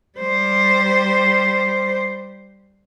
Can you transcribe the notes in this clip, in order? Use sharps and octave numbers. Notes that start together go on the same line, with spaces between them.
G3 C5